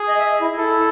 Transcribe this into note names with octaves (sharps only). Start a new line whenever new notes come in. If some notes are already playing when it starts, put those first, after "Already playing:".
Already playing: G#4
D#5
E5
D#5
E4
E4 A4